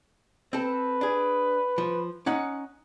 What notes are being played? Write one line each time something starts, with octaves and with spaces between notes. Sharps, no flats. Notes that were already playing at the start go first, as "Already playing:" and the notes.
C4 A4 B4
D4 G#4
F3
C#4 D#4 F#5